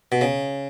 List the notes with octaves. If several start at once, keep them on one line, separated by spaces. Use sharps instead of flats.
B2
C#3